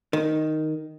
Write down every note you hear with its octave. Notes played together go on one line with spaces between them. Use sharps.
D#3